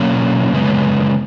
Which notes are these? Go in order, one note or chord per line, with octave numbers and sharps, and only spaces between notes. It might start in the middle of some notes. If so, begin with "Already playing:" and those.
Already playing: B2 F#3 A#3 C#4
F#2 C#3 G#3 B3